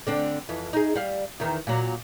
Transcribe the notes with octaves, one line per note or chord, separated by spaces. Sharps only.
D3 C4 D4
F2 E3
D#4 G#4
G3 F5
E2 D#3
A#2 F#3